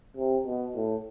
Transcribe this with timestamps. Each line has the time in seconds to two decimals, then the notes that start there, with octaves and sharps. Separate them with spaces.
0.17 C3
0.46 B2
0.75 A2